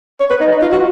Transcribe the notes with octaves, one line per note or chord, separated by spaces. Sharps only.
C#5
B4
D#4
D#4
F4
F#4